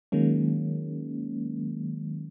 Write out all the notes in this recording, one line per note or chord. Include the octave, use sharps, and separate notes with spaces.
D#3 F#3 G#3 A#3 C#4